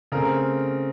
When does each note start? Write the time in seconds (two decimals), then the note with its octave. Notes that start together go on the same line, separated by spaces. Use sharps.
0.12 C#3 A3 C4 A#4